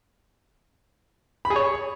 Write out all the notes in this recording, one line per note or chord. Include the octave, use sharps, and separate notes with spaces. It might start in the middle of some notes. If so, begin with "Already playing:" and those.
B5
G#4
C#5